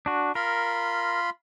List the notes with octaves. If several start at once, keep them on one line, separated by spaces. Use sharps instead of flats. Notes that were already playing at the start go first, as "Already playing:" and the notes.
D4 F#4
F4 A#4 B5 C6